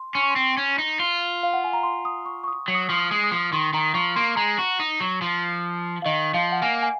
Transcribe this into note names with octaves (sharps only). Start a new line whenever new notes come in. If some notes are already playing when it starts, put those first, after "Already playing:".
Already playing: C6
C#4 C6
C#6
C6
C4
C#4
D#4
F4
F5
F#5
G#5
A#5
C6
D#6
C#6
C#6
D#6
F#3 C#6
D#6
C#6
F3
D#6
G#3
D#6
F3
D#3 C6
D#3 A#5
F3 C#6
A#3 C6
G#3 A#5
F#4
D#4
F#3
F3
F5
D#3 D#5
F3 F5
F#5
A#3 G#5
G#5